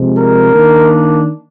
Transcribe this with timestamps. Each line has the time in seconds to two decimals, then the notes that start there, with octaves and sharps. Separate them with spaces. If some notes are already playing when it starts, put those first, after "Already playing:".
Already playing: C3 F3 G#3
0.16 A#4
0.52 D#3 A#3 D4